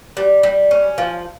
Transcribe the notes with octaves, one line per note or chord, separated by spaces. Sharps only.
G3
G3
C#4
F3